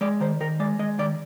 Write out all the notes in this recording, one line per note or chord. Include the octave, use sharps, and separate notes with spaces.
G#3 D5
D#3 C5
D#3 A#4
G#3 D5
G#3 D#5
D#3 D5